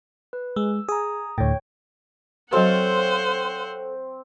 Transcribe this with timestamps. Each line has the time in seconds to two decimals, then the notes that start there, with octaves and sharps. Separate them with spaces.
0.33 B4
0.56 G#3 E6
0.89 G#4 A#5 D#6
1.38 D2 A2 C#5 G5
2.53 F#3 C4 F#4 A4 C5 C#5 F5 F#5